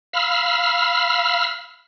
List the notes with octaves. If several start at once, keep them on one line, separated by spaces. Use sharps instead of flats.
F5 B5 E6 F6